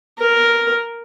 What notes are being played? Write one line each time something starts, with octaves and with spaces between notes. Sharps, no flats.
A#4